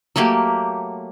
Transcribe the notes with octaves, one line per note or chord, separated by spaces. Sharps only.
F#3 A3 A#3 G4